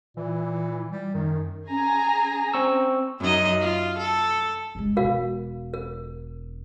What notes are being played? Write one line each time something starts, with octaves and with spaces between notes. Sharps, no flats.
A#2 E3
G3
F#2 D#3
C#4 G#4 G#5 A#5
C4 C#6 E6
F#2 D#4 D#5
F4
A4
G2 G#3
E1 F#4 A#4 F5
A#4